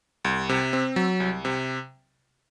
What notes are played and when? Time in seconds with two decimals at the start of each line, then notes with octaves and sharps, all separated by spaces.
0.25 C2
0.49 C3
0.73 C4
0.96 F#3
1.20 C2
1.45 C3